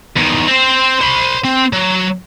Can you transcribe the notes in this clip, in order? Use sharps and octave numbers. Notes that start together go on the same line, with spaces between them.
E2 D#3
C4 C5
C5 B5
C4
F#3